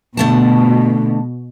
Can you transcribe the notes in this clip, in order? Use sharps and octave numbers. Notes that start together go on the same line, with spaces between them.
B2 D3 A3 A5